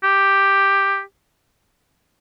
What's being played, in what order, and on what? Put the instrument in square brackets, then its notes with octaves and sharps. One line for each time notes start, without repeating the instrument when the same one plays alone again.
[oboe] G4